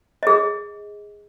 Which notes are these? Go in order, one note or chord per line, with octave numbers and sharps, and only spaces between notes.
G#4 D#5